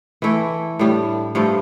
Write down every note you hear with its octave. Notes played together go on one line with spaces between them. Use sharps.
E3 A3 E4
A2 G3 D4
G2 F3 A3